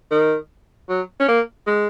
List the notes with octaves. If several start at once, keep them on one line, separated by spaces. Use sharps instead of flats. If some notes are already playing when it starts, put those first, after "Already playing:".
D#3
F#3
C#4
A#3
G#3